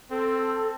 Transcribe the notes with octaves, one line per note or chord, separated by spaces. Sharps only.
C4 A4